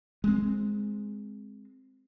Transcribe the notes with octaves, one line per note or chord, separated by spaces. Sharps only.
G#3 C4